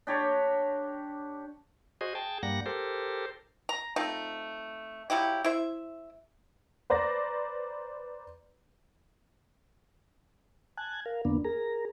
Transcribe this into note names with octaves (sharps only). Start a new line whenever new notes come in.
D4 G4 C#5 A#5
F#4 G#4 C5 D#5
G#4 G5 A5
G2 G3 A#3 F#5 A#6
G4 A4 A#4 C5
A#5
A3 C4 D#4 F4
F3 F#3 E4 G4
E4 C5 E5
B4 C5 D5 A#5 A#6
G#5 A5 F#6 G#6
A#4 F5
F2 D3 A#3 B3 D4
G#4 A#4 A#5